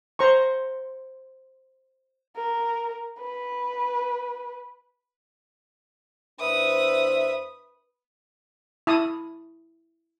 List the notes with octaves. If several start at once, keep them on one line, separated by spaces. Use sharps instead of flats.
C5 A#5 C#6
A#4
B4
E2 D4 B4 C5 E5 D#6
E4 A5 D#6